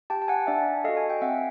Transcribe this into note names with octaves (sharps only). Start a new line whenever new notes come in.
G4 G5 A5
A5
F#5 G#5
D4 D5 E5
F#4 A4 D#5 F5
G#5
G5
C4 E5 F#5